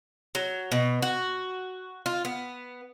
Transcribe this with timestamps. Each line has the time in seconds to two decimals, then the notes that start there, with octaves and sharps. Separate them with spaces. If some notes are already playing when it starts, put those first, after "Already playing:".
0.35 F#3
0.72 B2
1.02 F#4
2.06 F4
2.25 B3